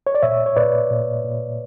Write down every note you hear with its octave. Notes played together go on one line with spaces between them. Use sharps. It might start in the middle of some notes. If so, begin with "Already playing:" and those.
C#5
D5
A#2 C#5 E5
C#5
A#2 B4 D5
A#2
A#2